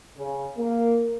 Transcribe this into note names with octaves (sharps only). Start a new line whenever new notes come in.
C#3
A#3